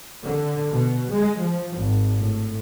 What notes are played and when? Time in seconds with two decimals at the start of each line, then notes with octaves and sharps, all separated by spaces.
0.24 D3
0.72 B2
1.11 G#3
1.42 F3
1.77 G#1
2.18 A2